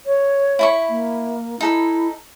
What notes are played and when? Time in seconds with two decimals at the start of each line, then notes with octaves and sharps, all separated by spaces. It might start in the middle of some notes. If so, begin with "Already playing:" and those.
0.06 C#5
0.59 E4 B5 C#6
0.90 A#3
1.61 D#4 E4 A4 B5